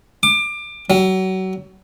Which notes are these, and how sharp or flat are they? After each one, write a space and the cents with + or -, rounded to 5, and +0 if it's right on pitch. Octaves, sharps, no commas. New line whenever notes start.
D6 +25
F#3 +30